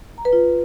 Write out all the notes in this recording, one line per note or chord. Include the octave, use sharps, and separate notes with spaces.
A#5
B4
F4